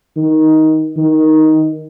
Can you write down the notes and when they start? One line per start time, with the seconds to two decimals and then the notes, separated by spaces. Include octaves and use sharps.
0.17 D#3
0.97 D#3